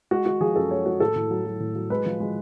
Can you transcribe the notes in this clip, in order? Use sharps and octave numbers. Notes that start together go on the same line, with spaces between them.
G#3 F#4
G#3 F#4
F3 G#4
F#2 A4
G#3 C#5
G#3 F#4
A2 A4
A2
F#3
F#3
A2
F#3
G#3 B4
F3
G#3